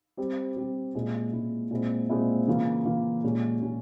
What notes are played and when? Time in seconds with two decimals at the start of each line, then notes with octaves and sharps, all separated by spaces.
0.17 G3 C4 G4
0.56 G3 C4 G4
0.95 A#2 G#3 C#4 E4
1.32 A#2 G#3 C#4 E4
1.71 A#2 G#3 C4 E4
2.09 A#2 G#3 C4 E4
2.47 C#3 E3 A#3 F4
2.85 C#3 E3 A#3 F4
3.23 A#2 G#3 C#4 G4
3.61 A#2 G#3 C#4 G4